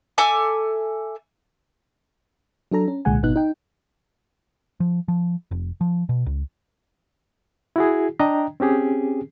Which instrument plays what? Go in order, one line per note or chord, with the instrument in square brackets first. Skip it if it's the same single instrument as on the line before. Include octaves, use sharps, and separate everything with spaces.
[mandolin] A4 E5 G#5 D6
[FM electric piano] F#3 D4 A4 A#5
C#4
C2 A#2 D3 G#3 F#5 G#5
G#1 B2 B3 D#4 F#6
D#4 G5
[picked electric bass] F3
F3
F1
F3
B2
C#2
[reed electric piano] E4 F#4 G#4
D4 D#5 G5 A#5
C4 C#4 G4 G#4